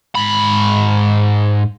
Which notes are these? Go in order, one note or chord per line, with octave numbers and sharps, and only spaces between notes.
G#2 B5